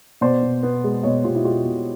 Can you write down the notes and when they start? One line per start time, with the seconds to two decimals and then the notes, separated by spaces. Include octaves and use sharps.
0.21 B2 C5 D5
0.42 B2
0.63 B3
0.84 G#3
1.03 B2 C#5 D#5
1.24 B2 F4 G4
1.35 E4 F#4
1.45 G#3 F4 G4
1.65 B2